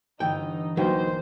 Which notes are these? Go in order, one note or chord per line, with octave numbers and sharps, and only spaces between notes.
G1 E3 D#4 G5
E1 F#3 A#3 D#4 B4 C5 G5 G#6